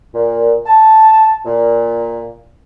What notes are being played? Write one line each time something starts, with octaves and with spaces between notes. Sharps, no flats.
A#2
A5
A#2